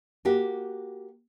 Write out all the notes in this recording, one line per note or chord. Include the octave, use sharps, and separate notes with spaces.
A#3 F#4 G4